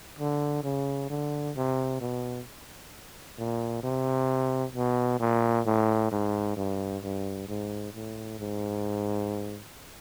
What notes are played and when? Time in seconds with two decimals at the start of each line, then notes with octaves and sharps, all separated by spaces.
0.19 D3
0.64 C#3
1.10 D3
1.56 C3
2.01 B2
3.39 A#2
3.83 C3
4.75 B2
5.20 A#2
5.66 A2
6.11 G#2
6.57 G2
7.03 G2
7.48 G#2
7.94 A2
8.39 G#2